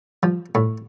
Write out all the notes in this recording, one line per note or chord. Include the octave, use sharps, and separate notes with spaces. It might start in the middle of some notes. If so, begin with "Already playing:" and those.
F3
A2